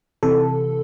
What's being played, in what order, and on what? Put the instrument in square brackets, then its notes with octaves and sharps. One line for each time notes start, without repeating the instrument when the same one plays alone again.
[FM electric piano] C3 E3 A4